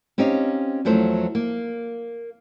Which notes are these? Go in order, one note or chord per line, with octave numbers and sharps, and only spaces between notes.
C4 C#4 D#4 G4 D#5 F5
E2 F3 F#3 A3 C5
A#3